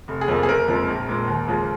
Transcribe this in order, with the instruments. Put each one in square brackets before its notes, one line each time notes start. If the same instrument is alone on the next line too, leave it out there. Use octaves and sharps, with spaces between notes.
[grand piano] F1
G#4
F2 F3 A#3
G#4
F#1 A#4
F2 F3 G#3
A#1
A#2 G#3
D#2
C#3 F3 G#3